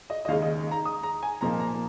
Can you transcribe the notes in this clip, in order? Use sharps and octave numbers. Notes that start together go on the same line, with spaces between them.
D#5
D#5
D#2 C#3 G#3 D#4 F5
D#5
A#5
D#6
A#5
G#5
A#2 F3 A#3 D#4 A#5
A#5